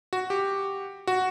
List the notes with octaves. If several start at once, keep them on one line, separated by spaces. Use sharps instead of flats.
F#4
G4
F#4